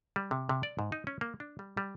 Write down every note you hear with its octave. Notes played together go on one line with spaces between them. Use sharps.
G3
C3
C3
D5
G#2
D#4
C#4
A#3
D4
G3
G3